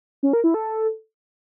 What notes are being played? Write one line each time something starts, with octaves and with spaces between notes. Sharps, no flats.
C#4
A#4
E4
A4